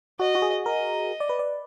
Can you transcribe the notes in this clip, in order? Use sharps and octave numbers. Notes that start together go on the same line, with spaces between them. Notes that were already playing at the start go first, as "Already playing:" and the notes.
F#4 D#5
F#4
G#4
A#4 D#5
D5
B4
D5